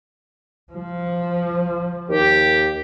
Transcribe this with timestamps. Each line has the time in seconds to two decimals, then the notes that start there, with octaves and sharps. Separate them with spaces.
0.73 F3
2.09 D#2 G4